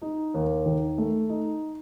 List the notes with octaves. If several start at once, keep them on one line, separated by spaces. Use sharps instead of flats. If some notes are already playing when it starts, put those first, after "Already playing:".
D#4
D#2
D#3
A3
D#4